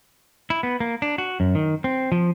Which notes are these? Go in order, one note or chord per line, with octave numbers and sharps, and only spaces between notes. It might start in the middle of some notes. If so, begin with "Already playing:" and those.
E4
B3
A#3
D4
F#4
F#2
D#3
C4
F3